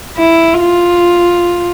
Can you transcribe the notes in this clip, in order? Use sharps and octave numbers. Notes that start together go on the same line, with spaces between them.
E4
F4